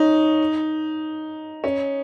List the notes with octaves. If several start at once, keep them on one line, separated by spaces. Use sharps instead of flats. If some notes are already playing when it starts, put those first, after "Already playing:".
Already playing: C#4 D#4
C#4